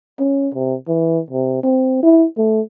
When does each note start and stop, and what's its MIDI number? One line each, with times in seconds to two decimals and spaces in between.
0.20 0.49 61
0.55 0.75 48
0.88 1.20 52
1.31 1.62 48
1.63 2.01 60
2.03 2.26 64
2.38 2.61 57